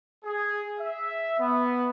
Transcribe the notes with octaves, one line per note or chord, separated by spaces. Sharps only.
G#4
E5
B3